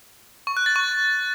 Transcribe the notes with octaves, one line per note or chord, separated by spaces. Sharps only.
C#6
F#6
A6
C#6